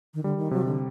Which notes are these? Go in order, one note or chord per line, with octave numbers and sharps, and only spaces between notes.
D#3
D3 G3
D#3
C3 F#3
D3